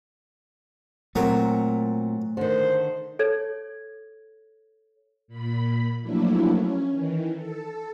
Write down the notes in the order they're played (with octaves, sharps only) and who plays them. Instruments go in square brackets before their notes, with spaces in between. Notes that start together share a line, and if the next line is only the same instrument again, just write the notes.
[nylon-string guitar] A#2 C4 [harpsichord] F#3 A#4 [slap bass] A3
[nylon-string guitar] D3 D#3 [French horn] C5
[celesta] A4 C#5 G#6
[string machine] A#2 B5
F3 F#3 A3 A#3 D4 E4
C#4
D#3 E3
A4